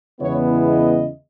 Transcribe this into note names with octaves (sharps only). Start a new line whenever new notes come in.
E2 C#3 G#3 B3 E4 C#5
D#5